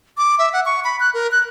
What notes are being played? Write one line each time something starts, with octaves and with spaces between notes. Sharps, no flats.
D6
E5
F#5
C#6
B5
F#6
A#4
F#6